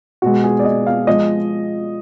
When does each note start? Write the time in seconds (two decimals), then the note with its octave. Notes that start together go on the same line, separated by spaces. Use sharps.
0.22 B2 G#3 F#4
0.44 G#4
0.59 D5
0.64 D#5
0.87 F5
1.07 F3 G#3 D#5